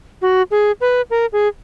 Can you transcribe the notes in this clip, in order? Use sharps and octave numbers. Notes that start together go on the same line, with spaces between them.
F#4
G#4
B4
A#4
G#4